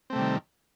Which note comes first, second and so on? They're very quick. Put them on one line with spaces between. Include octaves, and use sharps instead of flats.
C4 A3 C3 G3 D#3